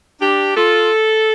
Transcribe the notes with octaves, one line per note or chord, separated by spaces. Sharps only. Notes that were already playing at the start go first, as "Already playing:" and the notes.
D4 G4
F4 A4